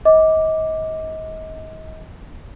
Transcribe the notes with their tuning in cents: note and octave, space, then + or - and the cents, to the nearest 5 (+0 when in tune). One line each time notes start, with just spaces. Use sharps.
D#5 +30 D6 +0